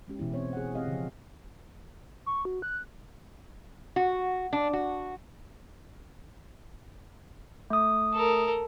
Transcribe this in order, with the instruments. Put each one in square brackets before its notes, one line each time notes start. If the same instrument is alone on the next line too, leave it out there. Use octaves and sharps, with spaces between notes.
[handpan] G#3 C#4 G4
B2 E3 B3 E4
C4 C5 C#5
G#4 F#5
C4 G4 D#5 F5
C#3 F3
[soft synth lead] C#6
F#4
F#6
[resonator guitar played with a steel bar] F#4
D4
F#4
[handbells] A3 D#6
[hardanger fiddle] A4 A#4